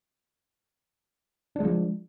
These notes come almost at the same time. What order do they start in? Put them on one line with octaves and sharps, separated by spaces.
D4 G#3 F3